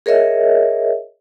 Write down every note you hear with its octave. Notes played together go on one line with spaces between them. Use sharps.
G#4 A#4 C#5 D#5 E5